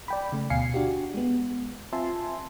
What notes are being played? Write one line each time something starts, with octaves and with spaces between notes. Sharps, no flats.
D5 G5 B5
C#3 A3
D2 B2 F5 G#5 C7 C#7
D4 F#4 G4
G#3 B3
C4 F4 E5 G#5 A5 C6